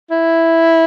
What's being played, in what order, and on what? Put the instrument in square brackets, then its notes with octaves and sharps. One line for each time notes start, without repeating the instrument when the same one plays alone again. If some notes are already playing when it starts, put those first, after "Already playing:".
[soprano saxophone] E4